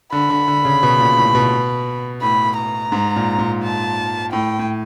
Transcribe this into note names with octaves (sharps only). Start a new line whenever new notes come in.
D3 B5
D3
D3
C#3
B2
A#2
A2
B2
A2 B5
A#5
G#2
A#2
A#2
A5
A2 G5
A2